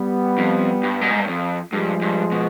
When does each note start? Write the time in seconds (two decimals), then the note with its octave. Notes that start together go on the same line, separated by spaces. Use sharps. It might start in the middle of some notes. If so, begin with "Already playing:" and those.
Already playing: G3 B3
0.38 F2
0.83 G2
1.01 B2
1.10 G#2
1.20 G2
1.27 F2
1.72 G2 F3 G#3
2.02 G2
2.32 B2